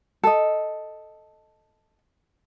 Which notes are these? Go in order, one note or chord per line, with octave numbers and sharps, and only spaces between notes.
A4 D#5